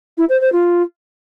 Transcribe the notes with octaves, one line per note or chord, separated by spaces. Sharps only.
E4
C5
C5
F4